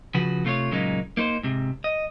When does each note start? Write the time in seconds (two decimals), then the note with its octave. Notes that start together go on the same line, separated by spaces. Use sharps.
0.14 C#3 F3 F#4 B4
0.45 C3 A3 F4 C5 C#5
0.71 F#2 A#2 C#3 G#3 A#3 D#4
1.17 A#3 D#4 B4 C5
1.43 G#2 C3
1.84 D#5